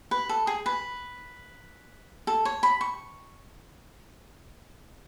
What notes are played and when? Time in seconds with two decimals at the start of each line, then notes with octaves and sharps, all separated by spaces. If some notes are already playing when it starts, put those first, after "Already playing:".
0.11 B4
0.29 A4
0.47 G#4
0.66 B4
2.27 A4
2.45 C#5
2.63 B5
2.81 C#6